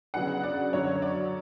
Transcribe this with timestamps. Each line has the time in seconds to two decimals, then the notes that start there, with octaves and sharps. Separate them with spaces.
0.14 C#3 F#3 B3 D4 F#5
0.43 D5
0.73 F#2 D3 F#3 C#5
1.02 D5